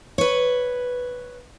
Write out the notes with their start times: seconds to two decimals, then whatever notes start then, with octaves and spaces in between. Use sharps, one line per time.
0.18 B4 C#5